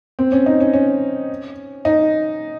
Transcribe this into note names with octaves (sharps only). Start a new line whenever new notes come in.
C4
C#4
D#4
C#4
C#4
D#4